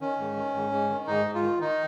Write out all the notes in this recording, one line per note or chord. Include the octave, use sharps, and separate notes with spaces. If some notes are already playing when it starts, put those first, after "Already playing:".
D#3 C#4
G#2
D#3
G#2
G#2
D#3
G#2 D#4
G#2
F4
D#3
D#3 D#4